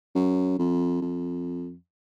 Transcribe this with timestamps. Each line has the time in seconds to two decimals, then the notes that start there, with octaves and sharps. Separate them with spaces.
0.15 F#2
0.59 F2
1.02 F2